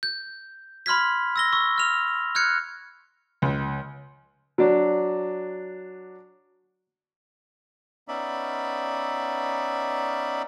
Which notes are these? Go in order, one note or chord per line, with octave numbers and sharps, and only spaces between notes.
G6
B5 C6 F6 G#6 B6
E6 A#6 G7
C#6 E6
F6 F7
F6 F#6 G#6 C#7
C#2
F#3 D4
B3 C#4 D#4 D5 E5 B5